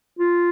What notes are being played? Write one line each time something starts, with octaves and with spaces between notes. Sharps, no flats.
F4